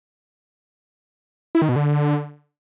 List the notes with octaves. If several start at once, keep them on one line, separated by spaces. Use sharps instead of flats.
E4
D#3
B2
D3